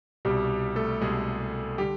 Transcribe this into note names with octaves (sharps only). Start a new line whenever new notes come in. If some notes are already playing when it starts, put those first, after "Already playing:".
C2 B2 G3 G4
A3 A4
C2 B2 G3 G#3 G#4
D3 G3 G4